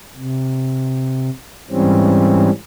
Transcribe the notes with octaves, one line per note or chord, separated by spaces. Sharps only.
C3
G#2 E3 G3 C4 C#4